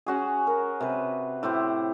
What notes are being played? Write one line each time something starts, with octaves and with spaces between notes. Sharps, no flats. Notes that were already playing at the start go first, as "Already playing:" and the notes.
C#4 F#4 G#4
A#4
C3 B4
A2 E4 G4 C5